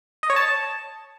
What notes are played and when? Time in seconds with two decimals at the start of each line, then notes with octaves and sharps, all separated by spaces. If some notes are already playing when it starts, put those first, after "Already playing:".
0.23 D#5
0.30 C#5
0.36 A5